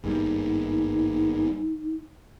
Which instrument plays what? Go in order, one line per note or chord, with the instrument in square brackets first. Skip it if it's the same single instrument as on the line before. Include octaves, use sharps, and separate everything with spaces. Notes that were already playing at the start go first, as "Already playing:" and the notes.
[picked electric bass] G#1 G2 G3 [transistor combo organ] A#3 B3 G#4 [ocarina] D#4